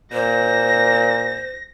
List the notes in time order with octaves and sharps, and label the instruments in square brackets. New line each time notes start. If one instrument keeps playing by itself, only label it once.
[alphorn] A#2 [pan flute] C5 [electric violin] A#6